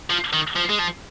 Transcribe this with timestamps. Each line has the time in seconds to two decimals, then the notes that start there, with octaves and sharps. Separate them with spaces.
0.10 F3
0.33 D#3
0.56 F3
0.70 G#3
0.79 F3